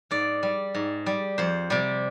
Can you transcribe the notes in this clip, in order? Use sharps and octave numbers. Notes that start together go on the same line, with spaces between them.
G#2 D5
G3
G#2
G3
F2 C5
C3 G3